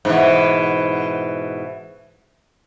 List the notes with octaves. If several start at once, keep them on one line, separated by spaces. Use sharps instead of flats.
G#2 B2 E3